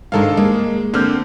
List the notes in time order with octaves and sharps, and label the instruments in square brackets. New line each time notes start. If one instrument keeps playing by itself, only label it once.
[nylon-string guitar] G#2 D#3 G#3 [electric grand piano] D4 A4 F5
[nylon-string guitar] G#3 [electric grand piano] A#3
[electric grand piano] D3 F6 G6 [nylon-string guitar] A#3 C4